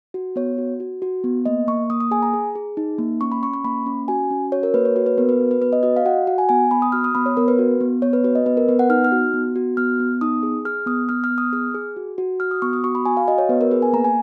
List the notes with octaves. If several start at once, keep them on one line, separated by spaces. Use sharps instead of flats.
F#4
B3 C#5
F#4
F#4
F#4
B3
A#3 D#5
A#3 C#6
A#3 D#6
D#6
G#4 G#5
A#5
G#4
G#4
D#4
A#3
C#4 C#6
B5
C#4 C#6
C#6
A#3 B5
C#4
F#4 G#5
C#4
F#4 C#5
A#4
A#3 B4
C#5
F#4 B4
B4
B3 A#4
B4
F#4
B4
B3 B4
D#5
F#4 D#5
F5
F#4 F#5
F#4 F#5
G#5
B3 G#5
B3 B5
D#6
F#4 F6
D#6
B3 B5
C#5
B3 A#4
B4
F#4
B3
B3 C#5
B4
F#4 B4
D#5
B3 B4
A#4
B3 B4
F#5
D#4 F6
F6
F#4
B3
F#4
B3 F6
B3
D#4 D#6
G#4
G#4 F6
B3 D#6
B3 F6
F6
B3
D#6
G#4 F6
G#4
F#4
F#4
F#4 F6
D#6
B3 C#6
D#6
F#4 C#6
B5
F#4 G#5
F5
F#4 D#5
C#5
B3 B4
A#4
G#4 B4
G#5
A#3 A#5
G#5